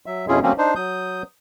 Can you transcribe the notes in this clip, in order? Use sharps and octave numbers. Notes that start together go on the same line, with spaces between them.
F#3 E5
F2 B2 C#4 E4 F4 G#4
D3 F#3 A3 A#3 C4 C#4
D4 D#4 C5
F#3 D#6 G6